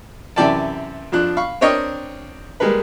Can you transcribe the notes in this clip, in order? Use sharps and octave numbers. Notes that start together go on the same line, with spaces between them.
F#2 C3 E3 D5 G5 A5
F2 F3 D4 F#6
F5 B5 C#6
C4 D4 A#4 C#5 D#5 G5
G3 G#3 A#3 A#4 B4